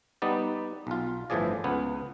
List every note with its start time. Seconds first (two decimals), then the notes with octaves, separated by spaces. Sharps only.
0.22 G3 B3 D#4 D5
0.87 B1 F4
1.30 G1 A2 E3 F3 G#4 D5
1.64 C#2 B3